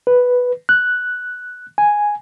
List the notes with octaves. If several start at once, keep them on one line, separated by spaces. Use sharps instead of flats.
B4
F#6
G#5